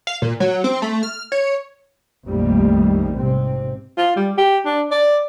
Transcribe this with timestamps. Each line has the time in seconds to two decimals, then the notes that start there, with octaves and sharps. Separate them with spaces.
0.07 F5
0.22 A#2
0.40 F#3
0.64 C4
0.82 A3
1.03 F6
1.32 C#5
2.27 A#1 F2 D#3 G3 A3 A#3
3.16 G#2 C3 C4
3.98 F4
4.16 G3
4.38 G4
4.66 D4
4.92 D5